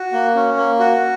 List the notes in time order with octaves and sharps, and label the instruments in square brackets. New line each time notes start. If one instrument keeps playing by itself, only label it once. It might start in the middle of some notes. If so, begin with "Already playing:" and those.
Already playing: [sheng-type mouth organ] F#4
A#3
C#4
A#3
F#4